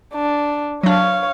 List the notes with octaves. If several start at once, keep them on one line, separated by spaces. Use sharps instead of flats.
D4
F#3 D4 C#5 F5